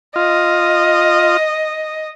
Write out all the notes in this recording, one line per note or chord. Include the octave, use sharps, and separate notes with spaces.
F4 D#5